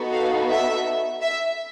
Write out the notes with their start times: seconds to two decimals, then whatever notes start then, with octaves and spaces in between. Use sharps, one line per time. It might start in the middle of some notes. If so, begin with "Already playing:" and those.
Already playing: B3 D#4 F#4 A4
0.12 F5
0.49 E5
1.21 E5